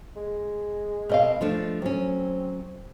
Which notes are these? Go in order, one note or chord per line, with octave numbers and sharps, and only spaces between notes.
G#3
B2 C4 A#4 D#5 F5
F3 A3 D4
F#3 C4 C#4